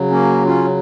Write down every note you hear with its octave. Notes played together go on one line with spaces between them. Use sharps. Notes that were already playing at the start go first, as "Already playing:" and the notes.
Already playing: C#3 F#3
A#3 C#4
C#4 F4